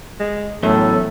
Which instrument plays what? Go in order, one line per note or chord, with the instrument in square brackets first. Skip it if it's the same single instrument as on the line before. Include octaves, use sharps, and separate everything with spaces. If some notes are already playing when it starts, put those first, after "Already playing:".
[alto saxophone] G#3
[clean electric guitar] E2 F#3 C#4 [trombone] A2 [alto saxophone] A3 [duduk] A4